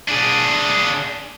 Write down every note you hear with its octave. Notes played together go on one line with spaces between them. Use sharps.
D4 G#4